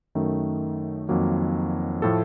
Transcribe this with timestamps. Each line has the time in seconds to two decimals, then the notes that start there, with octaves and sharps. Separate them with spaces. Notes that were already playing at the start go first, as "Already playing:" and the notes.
0.15 F#2 D#3 A3
1.09 F2 D#3 F#3 A#3
2.02 A2 F3 A3 A4